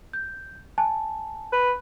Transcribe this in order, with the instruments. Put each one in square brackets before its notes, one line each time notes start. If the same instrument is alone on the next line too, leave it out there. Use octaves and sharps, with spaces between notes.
[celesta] G6
G#5 A5
[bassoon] B4